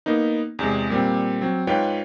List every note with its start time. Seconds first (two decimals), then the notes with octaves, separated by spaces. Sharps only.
0.06 A#3 B3 D#4
0.59 E2 C3 G#3
0.90 A#2 G3 C4
1.41 F#3 C4
1.67 G#2 F4 B4 C#5 G5